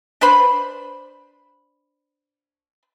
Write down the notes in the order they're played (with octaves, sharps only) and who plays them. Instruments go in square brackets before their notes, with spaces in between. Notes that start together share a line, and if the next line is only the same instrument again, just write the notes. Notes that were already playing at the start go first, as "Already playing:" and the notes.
[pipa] D4 B4 C5 B5